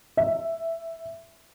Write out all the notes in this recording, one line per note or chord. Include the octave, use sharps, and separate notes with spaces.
E5